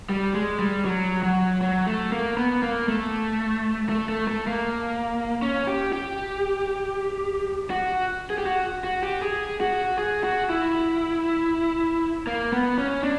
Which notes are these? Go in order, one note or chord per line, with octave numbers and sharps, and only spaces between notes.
G3
G#3
G3
F#3
F#3
F#3
A3
A#3
B3
A#3
A3
A3
A3
A3
A#3
C#4
G4
G4
F#4
G#4
G4
F#4
F#4
G4
G#4
F#4
G#4
F#4
E4
A#3
B3
C#4
D4